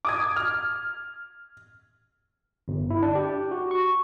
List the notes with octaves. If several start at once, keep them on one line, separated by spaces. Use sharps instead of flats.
D6 D#6 G#6
F6
G1
E4
D4
G4
F#4
C#6